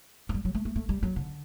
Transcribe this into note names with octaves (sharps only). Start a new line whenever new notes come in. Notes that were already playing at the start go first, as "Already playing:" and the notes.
F#3
G3
F#3
A3
A3
A3
G3
F#3
D3